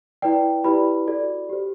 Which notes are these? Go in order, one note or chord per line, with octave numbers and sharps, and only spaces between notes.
E4 B4 D5 G5
E4 G4 B4 D5 B5
F#4 A4 D5
G4 C5